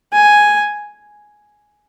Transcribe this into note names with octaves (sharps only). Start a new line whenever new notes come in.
G#5